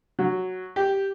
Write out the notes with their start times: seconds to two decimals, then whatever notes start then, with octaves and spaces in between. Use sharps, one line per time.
0.19 F#3
0.76 G4